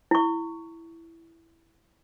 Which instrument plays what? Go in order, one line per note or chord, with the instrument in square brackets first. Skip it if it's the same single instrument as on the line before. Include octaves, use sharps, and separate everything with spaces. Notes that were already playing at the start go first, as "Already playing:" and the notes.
[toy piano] E4 C#6